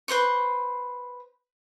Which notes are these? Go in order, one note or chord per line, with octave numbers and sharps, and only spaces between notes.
B4 C5 C6 C#6